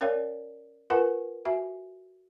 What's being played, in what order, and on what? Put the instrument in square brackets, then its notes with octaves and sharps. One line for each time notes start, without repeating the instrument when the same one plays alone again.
[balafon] C#4 A#4 C#5 D5 F5 G5
F4 A#4 B4 F#5 G#5
F#4 E5 G#5